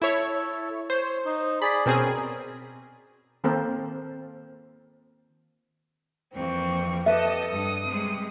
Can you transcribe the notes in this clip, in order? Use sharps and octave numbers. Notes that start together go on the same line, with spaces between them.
E4 A4 C#5
C5 C#5
D#4
G#4 D5 B5
B2 C4 C#4 G#4 A#4
D#3 A#3 C4 A4 A#4 C5
F2 E3 A#3 C4 C#6
G4 A4 B4 D#5 E5 A5
G2 A4 D#6
C3 G3 G#3